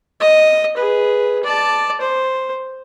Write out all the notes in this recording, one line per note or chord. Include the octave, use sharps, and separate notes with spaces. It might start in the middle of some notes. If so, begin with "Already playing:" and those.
D#5
G#4 B4
D5 A5
C5